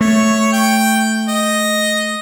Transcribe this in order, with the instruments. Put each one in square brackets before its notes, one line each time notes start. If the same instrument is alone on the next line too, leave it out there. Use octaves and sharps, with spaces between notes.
[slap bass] A3 [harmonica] C#5
[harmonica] G5
D#5